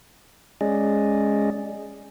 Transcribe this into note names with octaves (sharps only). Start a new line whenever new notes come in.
G#3 C#4 G#4 D5 D#5